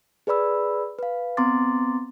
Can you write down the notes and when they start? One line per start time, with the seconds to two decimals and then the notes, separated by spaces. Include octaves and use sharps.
0.27 G#4 B4 D5 B5 E6
0.99 B4 F5
1.37 B3 C4 A#5 C6 D6 A6